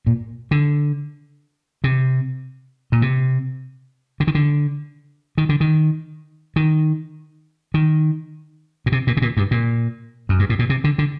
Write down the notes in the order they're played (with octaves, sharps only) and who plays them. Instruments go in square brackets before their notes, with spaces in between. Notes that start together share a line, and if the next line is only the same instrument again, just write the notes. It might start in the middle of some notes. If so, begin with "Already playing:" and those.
[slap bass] A#2
D3
C3
A#2
C3
D3
D#3
D3
D#3
D3
D#3
D#3
D#3
A#2
C3
A#2
C3
A#2
G2
A#2
F#2
G2
A2
A#2
C3
D3
D3